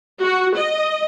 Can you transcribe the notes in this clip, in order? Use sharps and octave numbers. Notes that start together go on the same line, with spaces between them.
F#4
D#5